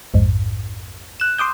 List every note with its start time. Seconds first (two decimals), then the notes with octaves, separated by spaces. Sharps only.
0.14 A#1 F2 G#2
1.20 F#6 E7
1.38 C6 D6 D#6 G6